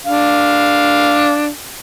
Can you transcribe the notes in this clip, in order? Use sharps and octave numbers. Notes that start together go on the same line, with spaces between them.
D4 F5